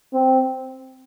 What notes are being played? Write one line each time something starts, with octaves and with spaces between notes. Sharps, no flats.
C4